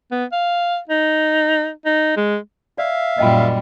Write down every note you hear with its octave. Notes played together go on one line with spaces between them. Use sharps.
B3
F5
D#4
D#4
G#3
D5 E5 F5
F#2 A#2 G3 D#5 G5 B5